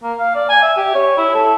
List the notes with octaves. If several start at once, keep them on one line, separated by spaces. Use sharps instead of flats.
A#3
F5
D5
G#5
E5
G4
C#5
E4
A4